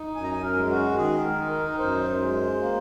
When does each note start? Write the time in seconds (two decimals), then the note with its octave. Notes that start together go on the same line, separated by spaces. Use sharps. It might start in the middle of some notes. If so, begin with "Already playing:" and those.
Already playing: D#4
0.16 F#2 G#5
0.24 A#5
0.31 G#5
0.43 A#4
0.57 G#3
0.70 F#4
0.98 D#3 G#4
1.25 A#4
1.39 D#4
1.52 A#4
1.79 F#2 C5
2.20 G#3
2.61 A#3